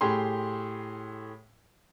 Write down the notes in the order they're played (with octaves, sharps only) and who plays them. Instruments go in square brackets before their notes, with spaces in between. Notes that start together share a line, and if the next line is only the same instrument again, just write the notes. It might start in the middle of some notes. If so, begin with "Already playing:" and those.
[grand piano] A2 G4 G#4 C6